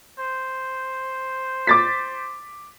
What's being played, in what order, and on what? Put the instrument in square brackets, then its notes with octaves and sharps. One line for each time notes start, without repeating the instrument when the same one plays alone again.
[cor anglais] C5
[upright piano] D6 A6 B6